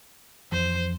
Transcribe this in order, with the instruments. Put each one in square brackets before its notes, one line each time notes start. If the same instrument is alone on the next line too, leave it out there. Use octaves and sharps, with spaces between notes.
[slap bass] F2 E3 [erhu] C5